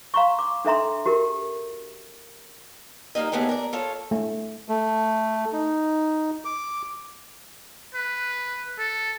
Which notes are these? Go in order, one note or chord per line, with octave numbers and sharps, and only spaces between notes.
F5 A#5 C6 C#6
D6
D4 A4 E5 A#5 C6
F#4 G4 A#4
G3 A#3 D#4 D#5
D#2 A3 B3 G4 G#4
A#4 D5
F4 A4 C#5
A3
A3
D#4
D6
B4
A4